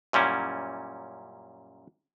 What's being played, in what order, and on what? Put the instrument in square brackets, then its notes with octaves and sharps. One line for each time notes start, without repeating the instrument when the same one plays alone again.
[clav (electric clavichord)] F#2 A#2 G3 C#4 E4